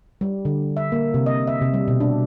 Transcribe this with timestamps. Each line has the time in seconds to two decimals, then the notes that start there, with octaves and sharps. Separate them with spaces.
0.21 G3
0.45 D3
0.77 E5
0.92 A#3
1.14 C3
1.26 D#5
1.47 E5
1.62 C3
1.74 G3
1.88 B2
2.00 D4